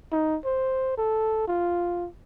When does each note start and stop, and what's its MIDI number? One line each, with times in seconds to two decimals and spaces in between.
0.12 0.38 63
0.45 0.94 72
0.98 1.46 69
1.48 2.08 65